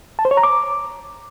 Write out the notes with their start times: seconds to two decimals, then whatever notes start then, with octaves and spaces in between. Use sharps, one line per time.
0.19 A5
0.25 C5
0.31 C#5
0.37 A#5
0.43 D6